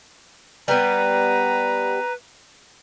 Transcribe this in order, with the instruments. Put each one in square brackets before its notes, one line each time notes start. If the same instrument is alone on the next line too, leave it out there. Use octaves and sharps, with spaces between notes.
[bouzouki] G3 B3 [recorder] B4 [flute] A#5